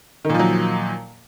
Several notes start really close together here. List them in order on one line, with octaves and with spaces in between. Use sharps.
D#3 A#2 F3 F#3